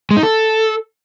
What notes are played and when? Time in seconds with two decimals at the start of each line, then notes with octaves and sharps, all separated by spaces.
0.11 G#3
0.17 D#4
0.23 A4